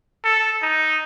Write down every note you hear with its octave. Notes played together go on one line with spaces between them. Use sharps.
A4
D#4